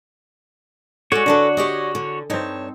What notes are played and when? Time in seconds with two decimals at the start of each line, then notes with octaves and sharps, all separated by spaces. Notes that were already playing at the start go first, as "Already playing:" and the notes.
1.12 G#3 F#4 A4 C#5 D5
1.26 D3 D4 A4 B4 D#5
1.57 G4 G#4 D5 D#5
1.95 D3
2.30 G2 C4 D#4 C#5 A5